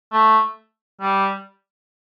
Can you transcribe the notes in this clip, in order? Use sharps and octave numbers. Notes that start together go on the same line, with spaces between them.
A3
G3